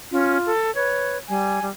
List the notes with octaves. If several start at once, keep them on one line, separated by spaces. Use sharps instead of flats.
C#4 F4
A4
B4 C#5
G3 G#5
G3